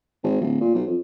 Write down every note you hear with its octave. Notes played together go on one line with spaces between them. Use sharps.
G#1
D1
A#2
B1
F2